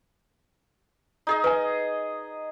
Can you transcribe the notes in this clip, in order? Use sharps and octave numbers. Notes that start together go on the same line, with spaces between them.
D#4 G#4 D#5
B4 D#5 G#5